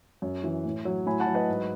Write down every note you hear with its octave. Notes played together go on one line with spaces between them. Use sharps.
F#2
E3
A2
F#3
A2 G#5 B5
F#5 A5
F#3
B4 D#5
G#2